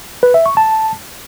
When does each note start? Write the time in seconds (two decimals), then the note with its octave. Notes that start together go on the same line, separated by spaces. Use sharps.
0.23 B4
0.34 E5
0.46 C#6
0.57 A5